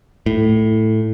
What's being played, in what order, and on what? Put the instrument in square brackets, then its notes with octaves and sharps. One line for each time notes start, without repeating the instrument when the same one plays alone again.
[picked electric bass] A2